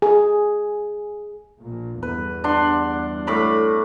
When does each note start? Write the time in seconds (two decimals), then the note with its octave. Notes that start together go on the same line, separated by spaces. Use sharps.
0.02 G#4
1.60 A#1 A#2
2.03 E2 G2 B4
2.44 D4 F#5 C6
3.27 A2 B5 D6